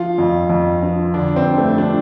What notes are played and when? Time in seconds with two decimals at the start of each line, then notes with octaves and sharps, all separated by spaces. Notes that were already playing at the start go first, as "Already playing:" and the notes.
Already playing: F3 F4
0.18 F2
0.50 F2
0.83 F3
1.14 D3 D4
1.36 C4
1.46 G2
1.58 A3
1.78 F3 D4